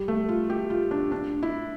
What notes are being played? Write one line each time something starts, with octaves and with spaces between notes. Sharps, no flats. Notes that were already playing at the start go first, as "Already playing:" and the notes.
Already playing: G3
A3
F4
G4
F4
D4
D4
E4